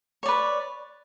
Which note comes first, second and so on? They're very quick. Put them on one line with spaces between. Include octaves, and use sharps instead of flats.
C#5 D5 B4